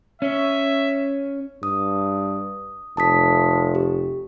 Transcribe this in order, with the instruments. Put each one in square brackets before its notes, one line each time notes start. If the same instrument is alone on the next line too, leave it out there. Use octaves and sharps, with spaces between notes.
[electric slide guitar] C#4 [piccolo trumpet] E5
[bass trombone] G2 [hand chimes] D#6
[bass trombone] F1 [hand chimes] A5 D#6 B6
[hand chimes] G4